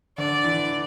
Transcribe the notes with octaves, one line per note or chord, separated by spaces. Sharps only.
D3 D5
E3